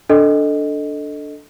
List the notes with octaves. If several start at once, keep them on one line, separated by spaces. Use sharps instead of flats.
D4 A4 D#5